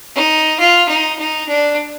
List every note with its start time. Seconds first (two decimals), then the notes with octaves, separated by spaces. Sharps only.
0.15 D#4
0.59 F4
0.88 D#4
1.19 D#4
1.48 D4